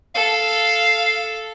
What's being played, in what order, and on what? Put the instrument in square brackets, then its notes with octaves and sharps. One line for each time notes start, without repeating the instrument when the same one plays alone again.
[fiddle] A4 [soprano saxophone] F5